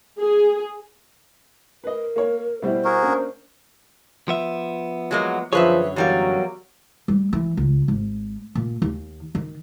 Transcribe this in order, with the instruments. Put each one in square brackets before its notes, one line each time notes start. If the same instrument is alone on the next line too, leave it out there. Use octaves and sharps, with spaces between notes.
[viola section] G#4
[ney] A#4 [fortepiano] B4 D#5
[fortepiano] A#3 C#5
[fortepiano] B2 G3 E4 [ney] C5
[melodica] F#4 G#4 A#4
[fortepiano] A#3 C#4 D4
[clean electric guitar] F3 B3 E5
[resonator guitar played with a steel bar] F#3 G#3 A#3
[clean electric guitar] F#2 D3 C#5 [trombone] F3 [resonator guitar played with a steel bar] G#4 B4 E5
[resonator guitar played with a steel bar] E2 G3 A#3 [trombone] F#3
[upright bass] G3
E3
C#2
G#1
A#2
D#2
D#3